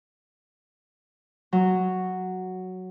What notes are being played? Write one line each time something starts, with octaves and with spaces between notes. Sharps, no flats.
F#3